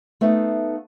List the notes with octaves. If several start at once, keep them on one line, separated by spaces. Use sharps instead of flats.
A3 B3 D#4 F5